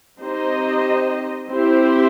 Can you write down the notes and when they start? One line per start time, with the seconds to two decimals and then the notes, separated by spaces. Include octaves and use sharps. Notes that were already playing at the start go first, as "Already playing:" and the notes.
0.20 C4 D#4 G4 C5 D#5
1.51 C4 E4 G4 C5 E5